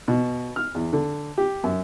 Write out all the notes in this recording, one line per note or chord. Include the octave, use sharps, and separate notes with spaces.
B2
F6
E2
D3
G4
F#2